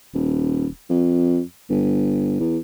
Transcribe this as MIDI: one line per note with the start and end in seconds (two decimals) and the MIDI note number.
0.14 0.67 27
0.90 1.40 41
1.70 2.38 31
2.40 2.58 40